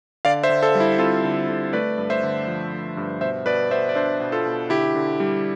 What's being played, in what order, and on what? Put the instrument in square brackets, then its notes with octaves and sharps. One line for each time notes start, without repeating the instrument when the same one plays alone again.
[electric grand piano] D3 D5 F5
C5 E5
D3
A4 C5
G3
E4
C4 F4 A4
D3
D3
A3 B4 D5
G2
C5 E5
D3
F3
A3
G2
B2 C5 E5
B2 B4 D5
B3 C5 E5
D5
D4 C5 E5
B2
F4 A4
B2
D3 E4 G4
D3
G3